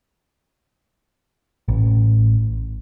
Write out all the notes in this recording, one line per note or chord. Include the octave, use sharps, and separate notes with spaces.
A1